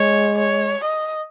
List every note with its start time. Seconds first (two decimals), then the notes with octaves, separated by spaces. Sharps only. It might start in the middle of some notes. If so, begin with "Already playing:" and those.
Already playing: G#3 C#5
0.39 C#5
0.85 D#5